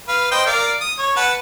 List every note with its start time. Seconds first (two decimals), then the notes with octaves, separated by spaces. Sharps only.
0.08 B4 F5
0.32 C5 D#5 G5
0.46 A#4 D5 F5
0.81 D#6
0.99 C#5
1.16 B4 F#5 A5